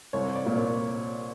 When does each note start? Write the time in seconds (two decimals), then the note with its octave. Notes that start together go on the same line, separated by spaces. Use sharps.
0.13 C2 C#5
0.35 D5
0.46 A#2
0.57 C#5